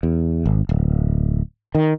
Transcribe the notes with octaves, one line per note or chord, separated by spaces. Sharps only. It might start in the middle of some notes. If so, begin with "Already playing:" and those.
E2
G#1
D1
D#3